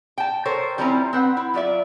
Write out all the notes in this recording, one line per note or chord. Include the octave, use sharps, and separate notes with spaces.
G5 A5
A4 A#4 C5 C#5
F3 G3 C4 C#4 E4 A#5
C4 B4 F#5
E4
F#3 F4 D5 E5